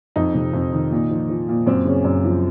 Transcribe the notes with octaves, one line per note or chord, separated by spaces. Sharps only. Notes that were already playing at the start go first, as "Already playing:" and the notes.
F2 D#4
C3
F2
D#3
A#2
F3
F3
A#2
F#2 C4
C#3 C#4
F#2
F3